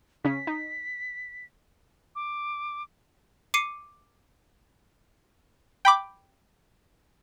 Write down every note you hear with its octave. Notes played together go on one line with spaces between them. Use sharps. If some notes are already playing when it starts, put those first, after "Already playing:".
C#3 C#4 B6
D#4
D6
D6 C7 C#7 D#7
G5 B5 D6